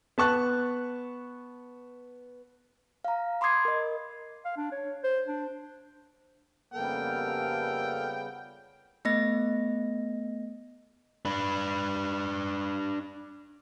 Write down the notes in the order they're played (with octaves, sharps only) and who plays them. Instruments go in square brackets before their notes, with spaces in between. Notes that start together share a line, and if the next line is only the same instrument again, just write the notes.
[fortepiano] B3 A5 C#6 F#6
[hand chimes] F5 A#5
B5 C6 D6 D#6 G#6 C7
A#4 D#5
[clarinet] F5
D4
C#5
C5
D4
[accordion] F2 A4 F6 [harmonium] C#3 G3 B3 [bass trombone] A#3 [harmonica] G5
[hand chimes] A3 B3 D#5 A#6
[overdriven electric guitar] D4 B4